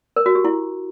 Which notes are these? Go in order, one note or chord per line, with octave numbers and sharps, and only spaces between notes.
A#4
F#4
G4
E4